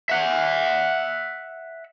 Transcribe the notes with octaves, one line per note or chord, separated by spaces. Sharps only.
E5 F#5